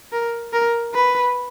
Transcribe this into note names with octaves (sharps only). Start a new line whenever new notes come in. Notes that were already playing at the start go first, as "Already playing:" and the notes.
A#4
A#4
B4